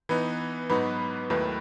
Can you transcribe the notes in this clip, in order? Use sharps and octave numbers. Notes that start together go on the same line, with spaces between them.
E3 B3 D#4 B4
G#2 F#3 B3 D#4 F#4 B4
D#2 D#3 F#3 A3 E4 B4